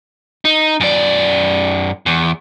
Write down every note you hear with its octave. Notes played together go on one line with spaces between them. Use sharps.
D#4
F#2 D5
E2